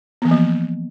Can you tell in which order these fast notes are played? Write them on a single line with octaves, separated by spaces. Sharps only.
B3 E3 A#3 F3